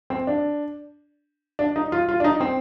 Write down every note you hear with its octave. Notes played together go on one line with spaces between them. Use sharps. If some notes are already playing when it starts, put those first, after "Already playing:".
C4
D4
D4
D#4
F4
F4
D4
D#4
C4